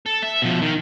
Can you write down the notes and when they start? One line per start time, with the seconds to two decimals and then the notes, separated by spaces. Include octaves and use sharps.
0.06 A4
0.23 E5
0.42 B2 F3
0.62 D#3